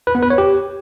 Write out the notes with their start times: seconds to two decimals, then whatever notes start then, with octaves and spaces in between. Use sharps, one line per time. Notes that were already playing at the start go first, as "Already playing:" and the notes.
0.07 B4
0.15 B3
0.23 B4
0.30 C#5
0.38 G4